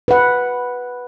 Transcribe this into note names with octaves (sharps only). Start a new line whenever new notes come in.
B4 F#5